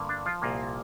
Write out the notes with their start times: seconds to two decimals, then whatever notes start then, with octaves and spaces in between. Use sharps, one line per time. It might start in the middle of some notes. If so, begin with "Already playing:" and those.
Already playing: G2 D3 A#3
0.09 D4
0.26 F3 F4
0.42 C2 A#2 A#3